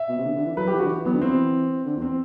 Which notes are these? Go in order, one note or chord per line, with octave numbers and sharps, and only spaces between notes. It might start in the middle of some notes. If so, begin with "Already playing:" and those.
Already playing: E5
B2
C3
D3
D3
E3
F#3 B4
G4
E3
D3 F#4
E3
F#3 B3
D3
E3 C4
D3
E2
C4